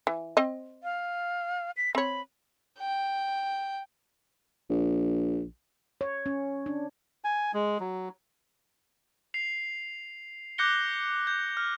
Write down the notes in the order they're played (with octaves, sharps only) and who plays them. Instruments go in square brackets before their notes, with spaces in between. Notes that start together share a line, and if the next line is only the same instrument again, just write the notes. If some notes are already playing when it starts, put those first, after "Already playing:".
[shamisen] E3
C4 D#5
[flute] F5
B6
[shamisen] C4 C#5 [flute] B5
[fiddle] G5
[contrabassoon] A#1
[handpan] C#5
C#4
D4
[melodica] G#5
G#3
F#3
[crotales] C7 F7
D6 F#6 G6 A#6 C#7 G7
G6
F6